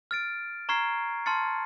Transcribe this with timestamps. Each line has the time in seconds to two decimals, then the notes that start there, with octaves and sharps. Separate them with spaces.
0.11 F6 A6 D7
0.69 A#5 C#6 F6 G#6 C7
1.26 A5 C6 F6 A6 C#7